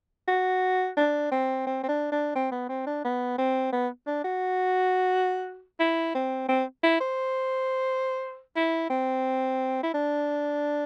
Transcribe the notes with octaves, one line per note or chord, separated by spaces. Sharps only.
F#4
D4
C4
C4
C4
D4
D4
C4
B3
C4
D4
B3
C4
B3
D4
F#4
E4
C4
C4
E4
C5
E4
C4
E4
D4